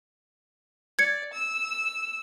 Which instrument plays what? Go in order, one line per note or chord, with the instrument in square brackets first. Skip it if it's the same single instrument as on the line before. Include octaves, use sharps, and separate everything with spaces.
[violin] D5 [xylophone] G#6 C#7
[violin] E6